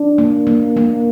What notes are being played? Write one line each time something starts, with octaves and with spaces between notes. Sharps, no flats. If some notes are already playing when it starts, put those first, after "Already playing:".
Already playing: D4
A#3
A#3
A#3